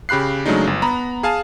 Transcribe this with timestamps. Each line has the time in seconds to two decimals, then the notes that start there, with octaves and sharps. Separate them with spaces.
0.09 C#3 G4 B5 F#6 C7
0.46 C#3 F#3 G#3 A3 D4 D#4
0.67 G1
0.82 B3 A#5 B5
1.23 G#4 F5 G#5 A5